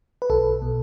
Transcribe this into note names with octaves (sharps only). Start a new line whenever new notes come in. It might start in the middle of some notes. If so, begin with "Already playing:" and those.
B4
B1 A4
B2